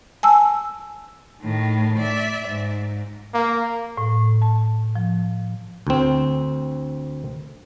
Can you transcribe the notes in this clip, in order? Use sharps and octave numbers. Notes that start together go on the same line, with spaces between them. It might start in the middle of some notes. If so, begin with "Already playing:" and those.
G#5 A5 E6
A2 D#3
D5 E5
G#2
A#3
A2
A5
F3
D2 C4